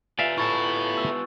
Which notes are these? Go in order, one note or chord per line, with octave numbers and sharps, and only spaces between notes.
B3 F4 D5 E5 F5 G#5
E4 A4 C#6 A6
E6